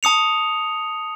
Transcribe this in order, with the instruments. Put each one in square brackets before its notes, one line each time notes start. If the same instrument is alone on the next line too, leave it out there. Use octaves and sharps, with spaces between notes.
[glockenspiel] A5 D#6 C#7 F7